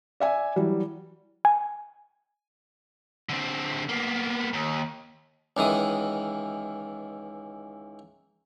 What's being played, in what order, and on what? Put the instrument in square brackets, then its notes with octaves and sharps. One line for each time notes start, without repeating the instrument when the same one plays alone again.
[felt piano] D5 E5 G#5
E3 F#3 G3
[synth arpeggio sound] G#5
[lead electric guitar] D3 C4
A#3 B3
D#2
[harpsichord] C#2 D#3 E3 D#6